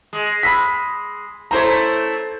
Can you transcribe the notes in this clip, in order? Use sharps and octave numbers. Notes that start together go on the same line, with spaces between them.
G#3
B5 E6 B6
A3 E4 A4 C5 C#5 A#5